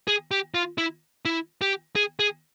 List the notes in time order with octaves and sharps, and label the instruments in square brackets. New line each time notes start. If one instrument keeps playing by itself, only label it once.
[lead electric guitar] G#4
G4
F4
E4
E4
G4
G#4
G#4